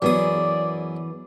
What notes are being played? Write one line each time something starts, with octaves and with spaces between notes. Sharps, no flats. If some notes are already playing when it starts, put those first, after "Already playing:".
F#2 E3 B3 G#4 D5 D#6